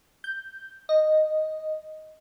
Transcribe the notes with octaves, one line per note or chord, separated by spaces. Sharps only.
G6
D#5